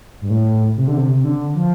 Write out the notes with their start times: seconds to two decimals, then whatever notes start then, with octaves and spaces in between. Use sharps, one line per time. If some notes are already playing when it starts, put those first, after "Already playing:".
0.21 G2
0.30 A2
0.77 C3
0.87 D3
0.97 C3
1.13 C3
1.24 D3
1.55 F3